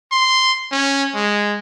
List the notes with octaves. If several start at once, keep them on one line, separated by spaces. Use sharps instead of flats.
C6
C#4
G#3